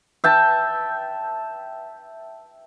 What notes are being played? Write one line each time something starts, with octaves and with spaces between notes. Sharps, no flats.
E5 G5 A5